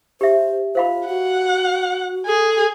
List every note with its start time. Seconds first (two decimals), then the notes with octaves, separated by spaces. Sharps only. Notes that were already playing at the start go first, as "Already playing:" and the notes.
0.21 G4 C5 E5
0.75 F4 C5 F5 B5
1.08 F#4 F#5
2.26 G#4 A4